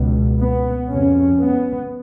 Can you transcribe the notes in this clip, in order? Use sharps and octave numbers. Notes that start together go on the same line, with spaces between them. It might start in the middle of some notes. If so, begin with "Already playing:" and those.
Already playing: C#2 B2
B3
F2 C#3 C#4
B3